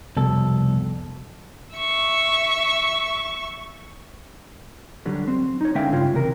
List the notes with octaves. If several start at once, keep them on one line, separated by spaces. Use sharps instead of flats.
C2 F2 B2 A4
E5 C#6
D3 F#3 G3
C4
D#4 C#5
D3 G#3 C#4 E5 F5 G5
G2 C#3 F4 C#5 G5
C#2 C3 E3 A#4